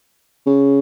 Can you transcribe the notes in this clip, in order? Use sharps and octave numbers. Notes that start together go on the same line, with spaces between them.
C#3